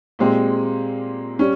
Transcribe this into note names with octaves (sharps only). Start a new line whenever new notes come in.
A#2 G#3 C4 G4
G3 C#4